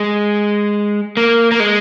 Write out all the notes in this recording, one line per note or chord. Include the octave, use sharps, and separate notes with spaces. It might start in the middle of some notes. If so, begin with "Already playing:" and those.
Already playing: G#3
A#3
A#3
G#3